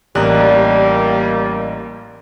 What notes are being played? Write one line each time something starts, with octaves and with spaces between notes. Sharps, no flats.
A1 G3 A#3 D4 G4 D#5 A#5 F#6